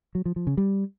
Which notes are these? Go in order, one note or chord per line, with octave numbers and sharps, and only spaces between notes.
F#3
F3
F3
C#3
G3